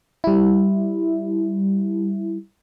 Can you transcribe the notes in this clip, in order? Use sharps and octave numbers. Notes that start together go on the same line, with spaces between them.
G3 E4